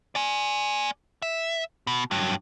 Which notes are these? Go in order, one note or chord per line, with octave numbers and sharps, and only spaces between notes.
D5 G#5
E5
B2
G2 F#3